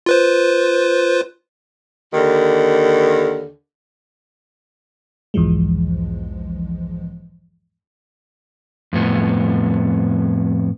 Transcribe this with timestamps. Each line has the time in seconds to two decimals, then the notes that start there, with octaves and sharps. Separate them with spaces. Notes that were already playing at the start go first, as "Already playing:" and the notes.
0.06 F4 B4 C5
2.14 D#2 D3 D#3
5.34 B1 E2 G#2 E3 F3 G#3
8.93 F2 A2 B3